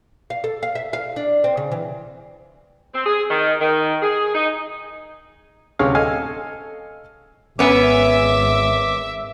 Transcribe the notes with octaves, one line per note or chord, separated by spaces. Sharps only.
F5
A4
F5
E5
F5
D4
C4
C#3
E3
C4
G#4
D#3
D#3
G#4
D#4
D2 C3 C#4 G#4 C#5 F5
A4 D#5 F5 G#5
G#1 B3 C#4 E5 D6